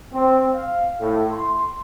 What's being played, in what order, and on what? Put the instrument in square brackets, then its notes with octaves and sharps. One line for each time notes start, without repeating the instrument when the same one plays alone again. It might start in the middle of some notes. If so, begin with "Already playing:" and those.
[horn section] C4
F5
A2
C6